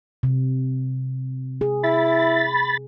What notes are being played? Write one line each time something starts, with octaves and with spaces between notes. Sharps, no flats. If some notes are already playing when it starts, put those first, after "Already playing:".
C3
G#4
E4 B5 A6